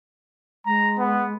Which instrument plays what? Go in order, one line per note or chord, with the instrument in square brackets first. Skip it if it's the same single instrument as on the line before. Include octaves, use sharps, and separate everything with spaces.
[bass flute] G#3 [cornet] A#5
[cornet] B3